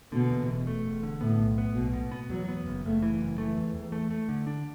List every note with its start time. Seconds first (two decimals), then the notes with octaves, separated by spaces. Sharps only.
0.12 B2 D3
0.30 E2
0.48 E1
0.67 A3
0.85 E1
1.03 D3
1.21 A2 B3
1.39 B1
1.58 B3
1.75 B1 B2
1.93 B2
2.11 B3
2.29 E2 F#3
2.48 B3
2.66 F#1
2.85 F#1 A3
3.02 E3
3.21 F#1
3.38 E3 A3
3.57 E2
3.75 E2
3.92 A3
4.10 A3
4.29 D3
4.47 D4